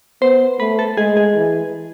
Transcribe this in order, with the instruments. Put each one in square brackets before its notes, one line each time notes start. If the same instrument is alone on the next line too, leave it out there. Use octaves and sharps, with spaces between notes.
[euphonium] B3 [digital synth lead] C5
[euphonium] A3 [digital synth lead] B4
[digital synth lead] A4
[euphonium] G#3 [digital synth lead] G#4
[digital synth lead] G#4
[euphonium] E3